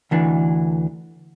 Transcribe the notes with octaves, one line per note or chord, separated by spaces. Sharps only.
D2 E3 D4